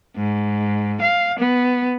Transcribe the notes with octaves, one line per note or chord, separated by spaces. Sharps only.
G#2
F5
B3